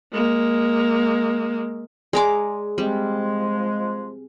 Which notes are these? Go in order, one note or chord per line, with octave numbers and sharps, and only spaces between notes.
G#3 A#3
G#3 G#4 D5 G#5 A#5 C6 D6
F3 G3 G#3 C4